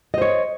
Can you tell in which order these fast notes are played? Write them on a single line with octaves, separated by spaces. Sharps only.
D#5 C5 C#5